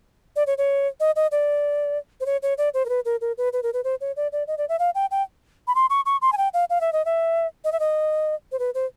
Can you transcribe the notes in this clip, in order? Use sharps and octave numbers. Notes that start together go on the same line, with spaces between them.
D5
C#5
C#5
D#5
D#5
D5
C5
C#5
C#5
D5
C5
A#4
B4
A#4
A#4
B4
B4
A#4
B4
C5
C#5
D5
D5
D#5
D5
E5
F5
G5
G5
B5
C6
C#6
C#6
C6
G#5
G5
F5
F5
E5
D#5
E5
D#5
E5
D#5
C5
B4
C5